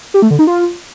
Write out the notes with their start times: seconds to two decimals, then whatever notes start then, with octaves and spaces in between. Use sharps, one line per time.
0.14 G4
0.22 A3
0.31 D3
0.39 D#4
0.47 F4